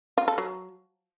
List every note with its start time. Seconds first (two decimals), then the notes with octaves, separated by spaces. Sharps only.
0.18 F4
0.28 A4
0.38 F#3